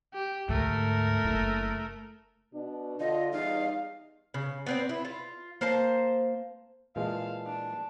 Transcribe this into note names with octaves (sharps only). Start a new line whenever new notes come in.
G4
D2 G#2 A3 A#4
F#1 E4
B2 D4
D3 F4 D#5
E2 G3 D#4 F5
C#3
B3 C4 D5
E4
F4
A#3 C5 A5 A#5
A#2 E3 G#3 F5 A5
D4